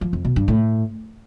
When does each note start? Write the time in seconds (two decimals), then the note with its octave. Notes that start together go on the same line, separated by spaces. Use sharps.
0.01 F3
0.13 F2
0.25 B2
0.36 G2
0.48 A2